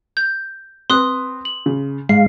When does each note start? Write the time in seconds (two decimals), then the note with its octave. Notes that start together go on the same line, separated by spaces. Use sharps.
0.17 G6
0.90 C4 B4 C6 D#6 F#6
1.45 F#7
1.66 C#3
2.09 G#2 G#3 F5 C7